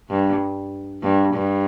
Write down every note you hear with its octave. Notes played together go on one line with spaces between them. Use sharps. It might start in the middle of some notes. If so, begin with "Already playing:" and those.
G2
G2
G2